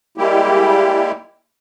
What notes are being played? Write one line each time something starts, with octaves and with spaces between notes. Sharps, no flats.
G3 G#3 A#3 E4 G4